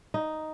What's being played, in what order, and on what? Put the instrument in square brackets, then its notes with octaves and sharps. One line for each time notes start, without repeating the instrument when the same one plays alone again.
[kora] D#4